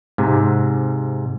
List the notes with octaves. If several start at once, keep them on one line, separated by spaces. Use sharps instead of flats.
G#2 C3